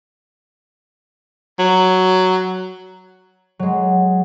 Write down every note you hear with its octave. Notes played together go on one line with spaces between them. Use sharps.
F#3
F#3 G#3